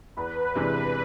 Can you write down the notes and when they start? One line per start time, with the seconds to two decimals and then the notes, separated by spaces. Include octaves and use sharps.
0.17 E2 B4
0.55 C3 E3 G#3 D4